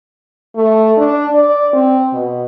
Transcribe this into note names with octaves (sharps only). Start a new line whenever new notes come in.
A3
D4
D5
C4
B2